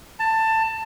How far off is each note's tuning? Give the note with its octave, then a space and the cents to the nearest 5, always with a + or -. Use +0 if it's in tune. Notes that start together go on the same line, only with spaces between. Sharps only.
A5 +15